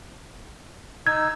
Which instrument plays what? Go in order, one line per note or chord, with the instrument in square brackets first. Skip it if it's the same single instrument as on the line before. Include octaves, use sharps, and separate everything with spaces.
[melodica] D#4 E6 [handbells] G#6